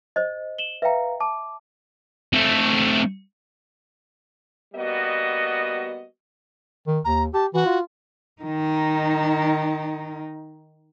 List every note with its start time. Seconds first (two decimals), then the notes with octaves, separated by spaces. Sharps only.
0.16 C5 D#5
0.58 E7 F#7 G7
0.82 B4 E5 F5 G5 A#5
1.20 A5 D6
2.33 A3 C4
4.75 G3 A#3 B3 F#4 D#5
6.87 D#3
7.05 D#2 A#5
7.34 G4 A5
7.54 E3 F#4
7.65 F4
8.42 D#3 D#4